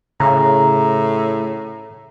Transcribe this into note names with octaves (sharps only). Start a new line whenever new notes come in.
A2 C#3 A#5